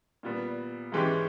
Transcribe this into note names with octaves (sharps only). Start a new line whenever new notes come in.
A#2 G3 B3
G#2 E3 G#3 C#4 G4